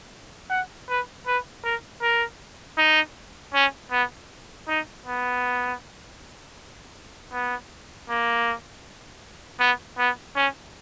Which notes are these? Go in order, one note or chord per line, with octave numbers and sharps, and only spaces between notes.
F#5
B4
B4
A#4
A#4
D#4
C#4
B3
D#4
B3
B3
A#3
B3
B3
C#4